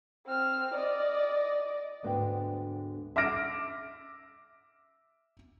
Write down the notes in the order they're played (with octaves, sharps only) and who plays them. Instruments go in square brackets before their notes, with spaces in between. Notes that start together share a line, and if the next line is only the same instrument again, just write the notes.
[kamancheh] C4 F6
D5 D#5
[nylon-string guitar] D2 G#2 B3 D4 E5 G5
[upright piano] E5 D6 F6 A#6 D7